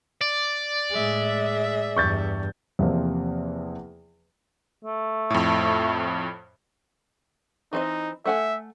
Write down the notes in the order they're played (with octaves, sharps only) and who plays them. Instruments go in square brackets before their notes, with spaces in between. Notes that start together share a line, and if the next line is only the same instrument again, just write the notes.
[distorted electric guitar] D5
[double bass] A2 G#3 [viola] G#4 E5
[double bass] E2 G2 [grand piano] C#6 G6 A6
[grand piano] E2 C3 F3 A#3 C4
[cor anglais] A3
[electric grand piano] F2 A2
[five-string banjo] E3 C4 D#5 [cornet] D#4
[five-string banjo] A3 F#5 G#5 [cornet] E5